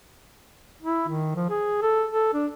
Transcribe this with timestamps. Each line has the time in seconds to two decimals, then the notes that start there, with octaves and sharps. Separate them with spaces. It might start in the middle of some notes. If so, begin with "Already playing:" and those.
0.83 E4
1.08 D#3
1.36 F3
1.50 G#4
1.82 A4
2.12 A4
2.34 D4